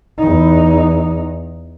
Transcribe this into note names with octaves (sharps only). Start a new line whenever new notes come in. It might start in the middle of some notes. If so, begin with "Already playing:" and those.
E2 D#4